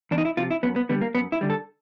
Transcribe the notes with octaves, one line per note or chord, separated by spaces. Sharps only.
E2 D4
D#4
E4
C3 F3 F4
E4
F#2 B3
B3
D3 G3 B3
A#3
F#2 B3
E4
D3 G3
A4